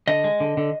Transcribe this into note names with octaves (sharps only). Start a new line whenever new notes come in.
D3 D#5
G#3
D3
D3